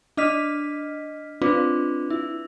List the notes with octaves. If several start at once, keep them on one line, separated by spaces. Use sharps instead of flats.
D4 D#5 F6 B6
C4 D4 F4 B4
E4